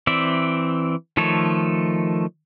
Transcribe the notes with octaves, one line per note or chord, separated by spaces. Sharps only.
E3 C4 D5 E5
D#3 F3 A3 A4 C#5